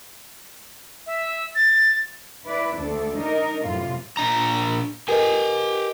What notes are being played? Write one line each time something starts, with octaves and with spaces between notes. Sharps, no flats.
E5
A6
E4 B4 D5
D2 D4 A4
D4 D#4 A#4
F#2 A2 C3 F4
A#2 D4 A#5
G4 A#4 B4 D#5 G#5